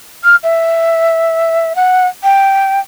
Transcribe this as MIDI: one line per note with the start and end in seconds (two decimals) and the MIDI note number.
0.24 0.36 89
0.43 1.73 76
1.76 2.07 78
2.23 2.80 79